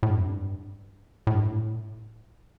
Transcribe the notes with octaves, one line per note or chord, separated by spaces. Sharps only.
A2
G2
F2
G2
A2
G2
A2